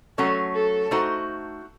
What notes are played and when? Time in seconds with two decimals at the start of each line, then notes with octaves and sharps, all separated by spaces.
0.17 F#3 A3 C#4 A4
0.54 A4
0.91 A3 D#4 F#4 C5